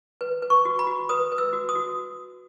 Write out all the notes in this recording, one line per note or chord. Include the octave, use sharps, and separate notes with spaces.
B4
B4
C#6
F#4
B5
F#4
B4 D#6
B4
E6
F#4
D#6
F#4